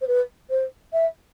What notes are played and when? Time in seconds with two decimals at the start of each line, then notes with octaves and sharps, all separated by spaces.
0.01 C5
0.07 B4
0.50 C5
0.93 E5